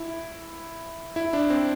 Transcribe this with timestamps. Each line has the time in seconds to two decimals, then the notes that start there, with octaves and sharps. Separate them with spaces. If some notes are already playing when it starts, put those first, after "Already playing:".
Already playing: E4
1.16 E4
1.33 D4
1.50 C4